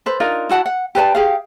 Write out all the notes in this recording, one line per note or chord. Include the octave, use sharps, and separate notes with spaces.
A4 B4 C5
D4 D#4 F4 A#4
E4 F#4 F#5 A5
F#5
G4 B4 D5 A5
G4 G#4 F5